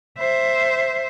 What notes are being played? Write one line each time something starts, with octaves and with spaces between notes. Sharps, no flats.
C5 E5